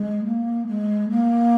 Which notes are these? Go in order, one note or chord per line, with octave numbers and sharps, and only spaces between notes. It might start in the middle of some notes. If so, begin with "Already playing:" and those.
Already playing: G#3
A#3
G#3
A#3